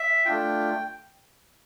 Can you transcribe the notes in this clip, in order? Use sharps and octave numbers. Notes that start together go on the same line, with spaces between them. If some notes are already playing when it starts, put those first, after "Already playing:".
Already playing: E5
A3 D4 F4 G5